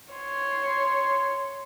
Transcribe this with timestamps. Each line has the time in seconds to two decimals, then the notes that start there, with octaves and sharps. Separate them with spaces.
0.14 C#5 C6